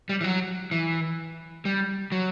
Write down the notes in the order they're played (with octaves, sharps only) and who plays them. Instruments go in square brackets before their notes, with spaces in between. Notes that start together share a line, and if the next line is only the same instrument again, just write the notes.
[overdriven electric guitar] G3
E3
F#3
E3
G3
F#3